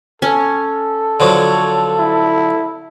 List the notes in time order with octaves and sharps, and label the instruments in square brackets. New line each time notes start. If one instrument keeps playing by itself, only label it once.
[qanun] C#4 [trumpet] A4
[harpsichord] D3 F3 F#3 [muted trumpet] C#5
[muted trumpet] E4